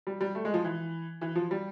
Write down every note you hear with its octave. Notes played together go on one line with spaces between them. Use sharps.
G3
G3
A3
G#3
F3
E3
E3
F3
G3